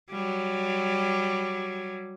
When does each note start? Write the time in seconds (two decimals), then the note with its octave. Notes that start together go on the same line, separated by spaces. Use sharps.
0.10 F#3 G3